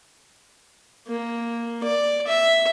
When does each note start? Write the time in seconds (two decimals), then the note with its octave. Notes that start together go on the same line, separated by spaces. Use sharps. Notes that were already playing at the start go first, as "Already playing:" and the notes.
1.07 A#3
1.83 D5
2.27 E5